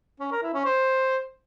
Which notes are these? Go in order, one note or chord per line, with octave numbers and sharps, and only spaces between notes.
C#4
A#4
E4
C#4
C5